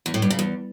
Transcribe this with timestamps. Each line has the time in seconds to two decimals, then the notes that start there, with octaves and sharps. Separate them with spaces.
0.06 E2
0.14 A2
0.22 G2
0.30 C#3
0.39 E2